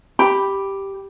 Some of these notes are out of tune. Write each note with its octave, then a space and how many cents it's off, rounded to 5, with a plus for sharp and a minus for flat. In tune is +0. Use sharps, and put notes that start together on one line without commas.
G4 +0 B5 +0